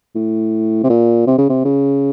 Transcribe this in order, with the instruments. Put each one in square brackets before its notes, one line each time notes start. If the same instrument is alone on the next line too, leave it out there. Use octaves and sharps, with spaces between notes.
[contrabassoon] A2
C3
A#2
C3
C#3
C3
C#3